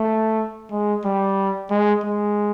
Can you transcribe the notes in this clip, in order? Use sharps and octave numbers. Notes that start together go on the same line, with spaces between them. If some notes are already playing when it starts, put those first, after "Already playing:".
Already playing: A3
G#3
G3
G#3
G#3